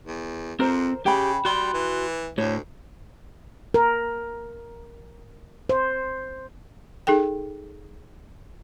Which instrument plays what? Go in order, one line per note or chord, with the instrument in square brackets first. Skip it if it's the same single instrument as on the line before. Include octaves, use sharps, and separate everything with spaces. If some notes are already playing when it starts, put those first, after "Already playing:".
[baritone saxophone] E2
[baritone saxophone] F2 [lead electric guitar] C4 [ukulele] A#4 C5
[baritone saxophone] C#3 [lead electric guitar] G4 [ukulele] G5 B5
[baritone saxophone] G3 [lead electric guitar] F#4 C6
[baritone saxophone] E3
[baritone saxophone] D2 [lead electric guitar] A2 [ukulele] C#5
[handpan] A#4
C5
[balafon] D#4 G#4 A4 G5